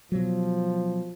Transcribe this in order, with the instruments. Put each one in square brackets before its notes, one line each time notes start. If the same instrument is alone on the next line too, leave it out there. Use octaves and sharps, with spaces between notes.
[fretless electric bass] B2 F#3 [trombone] F3